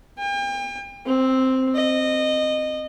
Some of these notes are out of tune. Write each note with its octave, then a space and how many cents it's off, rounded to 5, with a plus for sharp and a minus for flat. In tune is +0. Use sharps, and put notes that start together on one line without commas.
G5 +40
C4 +0
D#5 -20